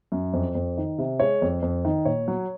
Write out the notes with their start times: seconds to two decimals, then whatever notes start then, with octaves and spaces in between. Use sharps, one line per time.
0.12 F#2
0.33 F2
0.55 F2
0.77 D#3
0.98 C3
1.20 G#3 C#5
1.42 F2
1.62 F2
1.85 D#3
2.05 A#2 C#5
2.28 F#3